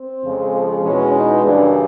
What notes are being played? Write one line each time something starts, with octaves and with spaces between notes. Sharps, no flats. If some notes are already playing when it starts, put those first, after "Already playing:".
Already playing: C4
F2 C#3 F3 G#3
E2 B2 G#3 C#4
D#4
F#2 C#3 E3 G3 D4